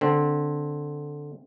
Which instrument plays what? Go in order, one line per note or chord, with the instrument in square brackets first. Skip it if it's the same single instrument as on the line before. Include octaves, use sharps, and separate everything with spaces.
[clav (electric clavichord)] D3 C4